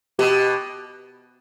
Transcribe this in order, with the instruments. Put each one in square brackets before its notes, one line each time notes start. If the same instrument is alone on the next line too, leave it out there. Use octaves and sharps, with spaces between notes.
[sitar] B2 [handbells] G4